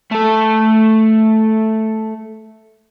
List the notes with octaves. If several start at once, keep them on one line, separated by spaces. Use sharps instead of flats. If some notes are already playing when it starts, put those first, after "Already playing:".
A3 A4